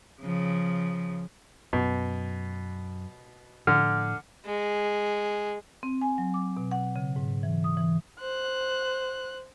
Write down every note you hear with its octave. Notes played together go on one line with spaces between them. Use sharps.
C#3 F3
F#2 B2
A2 D3 F3 F6
G#3
C4
G#5
F#3
D6
B2
F#5
C#3
G#2
E3
D#6
E3
C5 F#6